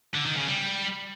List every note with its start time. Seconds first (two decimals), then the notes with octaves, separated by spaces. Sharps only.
0.14 D3
0.25 D#3
0.36 C#3
0.47 G3